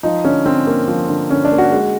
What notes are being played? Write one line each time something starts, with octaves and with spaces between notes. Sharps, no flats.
F3 D#4
D3 C#4
D3 C4
A#3
F3
D3
D3 C#4
D4
A#3
F#4
G#3